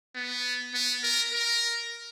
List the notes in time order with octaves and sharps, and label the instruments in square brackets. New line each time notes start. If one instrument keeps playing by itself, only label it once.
[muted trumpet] B3
B3
A#4
A#4